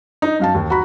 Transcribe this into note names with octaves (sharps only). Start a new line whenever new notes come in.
D#4
F#2 F5 A5
D#2
F#4 A#5 B5